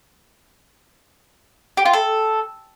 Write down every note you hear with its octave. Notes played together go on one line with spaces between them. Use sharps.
G4
F4
A4